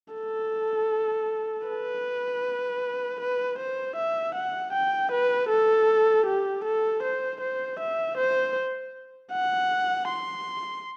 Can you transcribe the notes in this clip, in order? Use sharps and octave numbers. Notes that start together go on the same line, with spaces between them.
A4
B4
B4
C5
E5
F#5
G5
B4
A4
G4
A4
C5
C5
E5
C5
F#5
C6